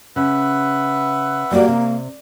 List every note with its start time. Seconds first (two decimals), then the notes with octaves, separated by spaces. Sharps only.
0.16 C#3 B4 E5 F#5
1.51 G3 A#3 F#4 D5
1.68 C3